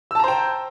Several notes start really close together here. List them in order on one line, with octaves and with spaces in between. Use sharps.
E6 A5 A#5 C5 G5